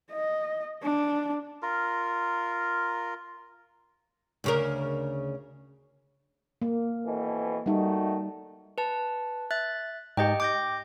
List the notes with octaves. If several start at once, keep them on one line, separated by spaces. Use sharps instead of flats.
D#5
D4
F4 A#4
D2 C#3 A#4
A#3
F2 B2 E3
D#3 G3 A3 D#4 F#4
B4 A5
E5 F#6 A6
G#2 G4 D#5 G5 G6
G5 D6 G6 A#6